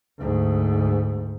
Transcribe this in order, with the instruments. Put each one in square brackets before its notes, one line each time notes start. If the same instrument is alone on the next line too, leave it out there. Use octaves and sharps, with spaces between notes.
[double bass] D2 G#2